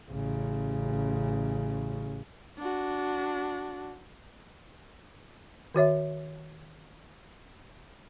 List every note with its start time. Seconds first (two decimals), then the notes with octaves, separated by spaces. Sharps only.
0.11 A1 C#3
2.58 D4 F#4
5.74 D#3 F#4 C#5 E5